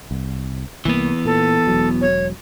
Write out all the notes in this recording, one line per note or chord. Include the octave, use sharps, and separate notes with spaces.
C2
C2 E3 A#3 B3
A#2 A4
E1 F#3
C#5